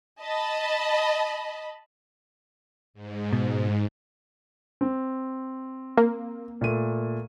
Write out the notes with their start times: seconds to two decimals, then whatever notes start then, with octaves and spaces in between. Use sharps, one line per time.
0.20 D#5 A5 B5
2.94 G#2
3.33 B2
4.81 C4
5.97 A#3
6.61 A#2 A3 D#7